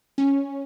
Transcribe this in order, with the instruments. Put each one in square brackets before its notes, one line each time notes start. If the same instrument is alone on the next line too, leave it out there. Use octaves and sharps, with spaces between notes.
[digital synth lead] C#4